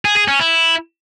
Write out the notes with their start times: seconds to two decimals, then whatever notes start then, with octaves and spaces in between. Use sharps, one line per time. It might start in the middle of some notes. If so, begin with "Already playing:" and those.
0.05 G#4
0.16 G#4
0.28 C#4
0.40 E4